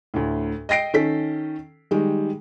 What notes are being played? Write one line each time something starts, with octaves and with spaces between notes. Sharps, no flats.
D2 A2
D#5 G5 A#6 C7 D7
D#3 C#4 A4 B6
D#3 G3 G#3